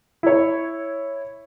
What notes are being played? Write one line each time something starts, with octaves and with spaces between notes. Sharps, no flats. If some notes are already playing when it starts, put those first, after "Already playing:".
E4 C#5